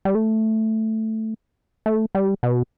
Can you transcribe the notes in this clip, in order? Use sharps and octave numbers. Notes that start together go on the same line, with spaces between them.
G3
A3
A3
G3
B2